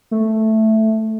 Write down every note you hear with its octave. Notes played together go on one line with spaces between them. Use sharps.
A3